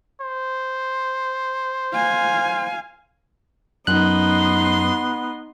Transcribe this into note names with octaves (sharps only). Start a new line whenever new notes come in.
C5
F5 G#5
F#2 B3 D#4 C6 F#6